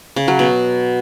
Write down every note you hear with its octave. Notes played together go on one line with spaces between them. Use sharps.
C#3
F#3
B2